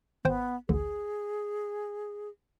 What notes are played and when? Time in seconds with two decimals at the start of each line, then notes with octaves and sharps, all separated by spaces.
0.25 G#1 B3 C5 G5
0.69 A1 D2 D3 G#4